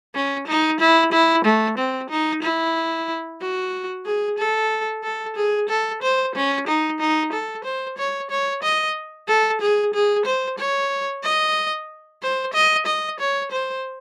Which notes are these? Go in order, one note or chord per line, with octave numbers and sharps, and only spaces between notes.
C#4
D#4
E4
E4
A3
C4
D#4
E4
F#4
G#4
A4
A4
G#4
A4
C5
C#4
D#4
D#4
A4
C5
C#5
C#5
D#5
A4
G#4
G#4
C5
C#5
D#5
C5
D#5
D#5
C#5
C5